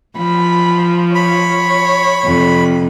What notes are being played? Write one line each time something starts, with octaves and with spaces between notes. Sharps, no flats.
F3 B5
C#5 B5
F2 C3